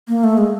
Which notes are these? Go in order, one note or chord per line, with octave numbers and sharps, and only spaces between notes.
A#3
A3
G#3